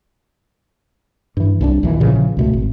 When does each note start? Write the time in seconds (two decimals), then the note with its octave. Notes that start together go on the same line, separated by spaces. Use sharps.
1.37 G2 E3
1.61 C2 E3 D4
1.83 A#1 D#2 D#3 E3
2.00 A#2 C#3 E3 F3
2.37 C#2 B2 A3
2.53 G#1